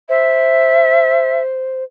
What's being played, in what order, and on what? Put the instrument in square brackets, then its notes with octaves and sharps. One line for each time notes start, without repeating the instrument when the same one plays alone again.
[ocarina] C5 [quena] E5